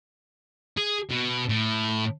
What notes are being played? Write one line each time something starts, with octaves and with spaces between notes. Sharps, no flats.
G#4
B2
A2